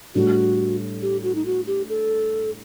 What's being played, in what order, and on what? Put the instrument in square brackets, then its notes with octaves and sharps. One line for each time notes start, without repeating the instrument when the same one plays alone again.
[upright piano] A2 G3 D4 [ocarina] F#4
[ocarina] G4
F#4
D#4
F#4
G4
A4